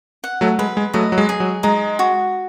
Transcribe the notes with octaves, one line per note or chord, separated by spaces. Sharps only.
F#5
F#3 A3
G#3 B4
G#3
F#3 A3 D#5
F#3
G#3
G#4
F#3
G#3 D#4
F#4